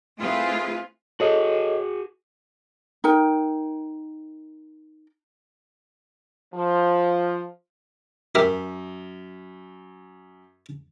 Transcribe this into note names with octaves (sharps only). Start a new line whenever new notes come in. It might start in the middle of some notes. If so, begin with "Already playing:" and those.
A3 C4 E4 F4 G#4 B4
F#4 G#4 A4 C#5 D#5
D#4 A#4 G5
F3
F#2 G4 A#4 E5